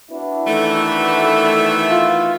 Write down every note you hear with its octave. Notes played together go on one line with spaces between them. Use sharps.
B3 D4 E4 F#4
D#3 E3 A3
F4